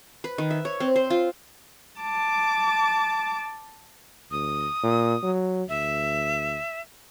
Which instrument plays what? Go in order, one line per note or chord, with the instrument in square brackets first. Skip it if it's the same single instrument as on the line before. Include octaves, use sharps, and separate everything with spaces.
[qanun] B4
D#3
E5
C#5
C4
C5
F4
[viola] A5 D6
[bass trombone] D2 [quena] D#6
[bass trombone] A#2
F#3
[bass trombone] D2 [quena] E5